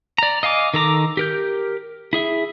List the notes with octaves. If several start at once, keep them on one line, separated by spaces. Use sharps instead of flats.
D5 A#5
D#5 F5 G#5 D6
D#3 A4 A#5 D6
G4 A#4 G6
E4 G#4 E5